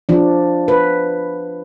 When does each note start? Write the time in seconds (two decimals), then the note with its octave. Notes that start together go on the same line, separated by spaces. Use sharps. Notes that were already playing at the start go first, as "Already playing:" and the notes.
0.09 F3 D4
0.68 B4